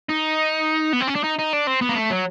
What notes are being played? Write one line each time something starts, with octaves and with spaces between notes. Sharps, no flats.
D#4
B3
C4
C#4
D4
D#4
D#4
D4
C4
B3
A#3
A3
F#3